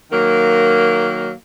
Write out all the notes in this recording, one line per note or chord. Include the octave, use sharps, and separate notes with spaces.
D#3 F#3 A#3